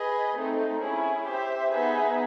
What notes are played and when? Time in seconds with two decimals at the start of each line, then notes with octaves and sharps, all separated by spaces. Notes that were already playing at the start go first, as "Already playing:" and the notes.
Already playing: G#4 B4 D#5
0.37 A3 C4 D#4
0.81 C#4 E4 G#4
1.26 G4 C5 E5
1.71 B3 D#4 G#4 B4 E5